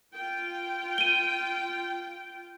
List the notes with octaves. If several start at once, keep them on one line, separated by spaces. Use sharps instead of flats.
F4 G5
D#7 G7